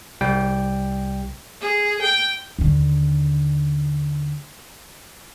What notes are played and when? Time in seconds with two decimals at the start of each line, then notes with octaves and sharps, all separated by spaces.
0.21 C2 G3 G5
1.61 G#4
2.02 G5
2.59 D#2 D3